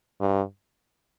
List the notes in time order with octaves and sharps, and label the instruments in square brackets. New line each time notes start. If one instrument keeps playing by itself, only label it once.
[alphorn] G2